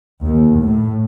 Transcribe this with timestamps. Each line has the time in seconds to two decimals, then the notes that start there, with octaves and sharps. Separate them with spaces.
0.23 D#2
0.60 A2